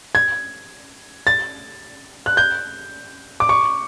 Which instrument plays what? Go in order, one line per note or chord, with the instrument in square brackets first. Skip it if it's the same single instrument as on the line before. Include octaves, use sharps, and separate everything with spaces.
[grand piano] G#6
A6
F#6
G6
D6
C#6